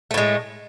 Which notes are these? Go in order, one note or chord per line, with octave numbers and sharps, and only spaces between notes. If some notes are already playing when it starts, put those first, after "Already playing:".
A2 G#3 A3